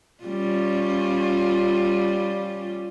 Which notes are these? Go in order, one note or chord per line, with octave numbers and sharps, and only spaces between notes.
G3 C#4 F4